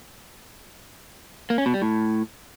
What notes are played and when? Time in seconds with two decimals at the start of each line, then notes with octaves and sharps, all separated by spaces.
1.50 A#3
1.58 C#4
1.66 B2
1.74 G3
1.82 A2